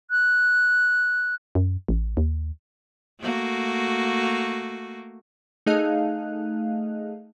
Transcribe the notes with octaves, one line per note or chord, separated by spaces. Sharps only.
F#6
F#2
A1
D#2
A3 A#3 F#4
A3 D#4 G#4 D#5 F5 F#6